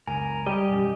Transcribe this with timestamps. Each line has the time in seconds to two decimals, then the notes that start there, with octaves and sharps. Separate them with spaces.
0.07 F#1 C#2 A#4 G#5
0.46 G3 G4 D#5
0.69 E1 F#2